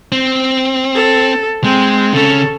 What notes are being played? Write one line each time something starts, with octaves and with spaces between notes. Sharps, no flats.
C4
A4
G#3 C4
C#3 C#4 A4